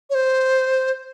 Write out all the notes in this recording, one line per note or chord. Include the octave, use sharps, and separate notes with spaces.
C#5
C5